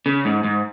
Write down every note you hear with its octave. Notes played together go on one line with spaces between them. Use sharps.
C#3
G#2
G#2